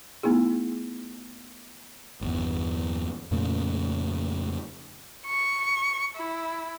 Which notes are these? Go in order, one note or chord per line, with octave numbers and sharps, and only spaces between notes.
A3 B3 D#4 E4 G#4
G1 E2
F2 A#2 C#3 A3
C#6
E4